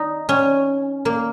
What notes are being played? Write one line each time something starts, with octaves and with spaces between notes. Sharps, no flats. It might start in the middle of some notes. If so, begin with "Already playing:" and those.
Already playing: D#4
C#4
A#3